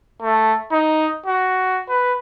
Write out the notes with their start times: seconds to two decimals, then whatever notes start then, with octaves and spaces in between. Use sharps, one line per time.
0.22 A3
0.72 D#4
1.26 F#4
1.89 B4